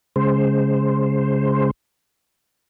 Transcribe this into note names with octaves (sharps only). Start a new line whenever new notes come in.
C#3 G#3 C5